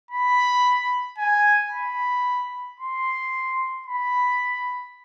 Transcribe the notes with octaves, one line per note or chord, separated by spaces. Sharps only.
B5
G#5
B5
C6
B5